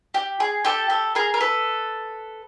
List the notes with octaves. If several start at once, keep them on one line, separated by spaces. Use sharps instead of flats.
G4
G#4
G4 A4
G4 A4
G#4 A#4
A#4
A4 B4